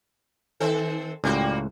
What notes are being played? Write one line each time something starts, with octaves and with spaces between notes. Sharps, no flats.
D#3 C4 A4
C#2 A2 G3 A#3 F#4